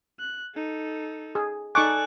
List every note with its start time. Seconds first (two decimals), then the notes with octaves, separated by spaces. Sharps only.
0.19 F#6
0.54 D#4 A4
1.35 G#4
1.75 D#4 A4 D5 G#5 C#6 D6 F#6